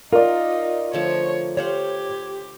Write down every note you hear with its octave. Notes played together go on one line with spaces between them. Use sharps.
D#4 F4 A#4 D5
D3 F3 A3 C#5
F4 G4 C5 C#5 F#5